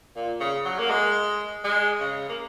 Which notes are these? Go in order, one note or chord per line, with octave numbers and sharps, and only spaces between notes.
A#2
C#3
F#3
A#3
G#3
G#3
C#3
A#3